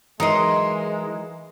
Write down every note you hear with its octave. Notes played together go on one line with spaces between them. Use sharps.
E3 F#3 G#3 D#4 A#4 D#5 C6